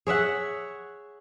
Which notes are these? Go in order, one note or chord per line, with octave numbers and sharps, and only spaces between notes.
G#4 C#5 E5 F#5